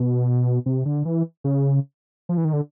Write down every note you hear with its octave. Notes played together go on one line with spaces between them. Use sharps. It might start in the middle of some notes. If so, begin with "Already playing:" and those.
Already playing: B2
C3
D3
E3
C#3
F3
E3
D#3
D3